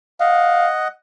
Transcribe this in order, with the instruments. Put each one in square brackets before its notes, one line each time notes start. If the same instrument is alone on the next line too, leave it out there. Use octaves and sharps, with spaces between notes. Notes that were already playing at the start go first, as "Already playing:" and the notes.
[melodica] D#5 F#5 [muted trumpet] F5